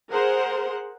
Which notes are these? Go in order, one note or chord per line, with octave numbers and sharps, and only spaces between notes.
G#4 A#4 C5 F#5